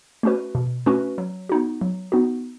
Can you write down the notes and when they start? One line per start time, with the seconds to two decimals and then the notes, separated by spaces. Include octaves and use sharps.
0.23 A3 C#4 F#4 B4
0.55 B2
0.86 A3 C#4 F#4 B4
1.18 F#3
1.49 B3 D#4 F#4
1.81 F#3
2.12 B3 D#4 F#4